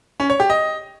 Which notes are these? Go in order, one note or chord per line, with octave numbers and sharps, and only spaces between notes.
C#4
C#5
G4
D#5